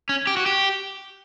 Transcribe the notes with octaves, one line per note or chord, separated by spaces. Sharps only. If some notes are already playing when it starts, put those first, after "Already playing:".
C#4
G4
F#4
G4